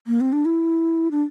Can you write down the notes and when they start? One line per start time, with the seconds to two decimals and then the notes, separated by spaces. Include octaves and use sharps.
0.07 A#3
0.21 C4
0.33 D4
0.45 E4
1.11 D4